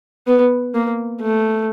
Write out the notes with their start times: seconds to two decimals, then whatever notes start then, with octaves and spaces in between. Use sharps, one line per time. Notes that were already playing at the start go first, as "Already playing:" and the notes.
0.27 B3
0.74 A#3
1.22 A3